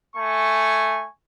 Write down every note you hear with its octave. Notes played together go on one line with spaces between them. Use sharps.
A3 G#5 C#6